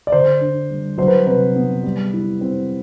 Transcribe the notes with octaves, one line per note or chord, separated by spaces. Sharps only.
D5
D3 C5
D4
G3
F#3 C5
B4
C3 B4
B3
G3
E4
C4